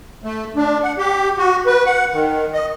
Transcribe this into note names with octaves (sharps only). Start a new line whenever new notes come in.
A3
D4
F#5
G4
F#4
B4
F#5
D#3
D#5